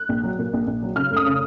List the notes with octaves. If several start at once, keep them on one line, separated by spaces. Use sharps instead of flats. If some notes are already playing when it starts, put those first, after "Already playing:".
Already playing: F#6
A#1
F#3
A#2
A#1
A#1
F#3
C#3 F6
F1
D#6
C#3